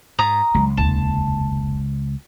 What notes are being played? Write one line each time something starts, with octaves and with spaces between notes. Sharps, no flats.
G#2 A#5 D#6
C#2 F#3 G#3
F1 D#2 A5